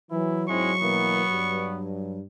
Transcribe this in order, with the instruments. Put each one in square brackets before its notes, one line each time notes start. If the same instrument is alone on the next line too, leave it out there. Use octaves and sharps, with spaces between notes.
[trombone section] E3 [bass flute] F#3 [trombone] E4
[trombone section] G#2 C4 E4 [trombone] G#3 [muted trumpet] C#6
[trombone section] B2 E3 A#3 [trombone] B3
[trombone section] G2